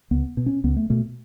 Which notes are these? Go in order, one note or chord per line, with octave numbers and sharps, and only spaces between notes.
C#2 B3
B2
C#4
C#2 B3
A3
B2 A3